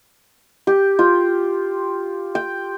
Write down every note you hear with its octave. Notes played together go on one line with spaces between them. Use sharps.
G4
F4
G5